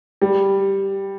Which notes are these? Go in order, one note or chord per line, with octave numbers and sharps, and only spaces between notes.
G3